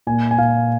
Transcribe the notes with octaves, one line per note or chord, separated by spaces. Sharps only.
A#2 G#5
G#5
A#2 F5